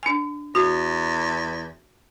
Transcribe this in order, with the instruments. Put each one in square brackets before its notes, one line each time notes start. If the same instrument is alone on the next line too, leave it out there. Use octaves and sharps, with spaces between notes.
[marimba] D4 G#5
[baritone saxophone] E2 [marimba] F#4